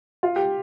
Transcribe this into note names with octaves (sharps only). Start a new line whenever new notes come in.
F4
G4